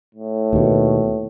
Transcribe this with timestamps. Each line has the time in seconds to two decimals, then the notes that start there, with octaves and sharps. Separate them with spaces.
0.15 A2
0.53 D#2 B2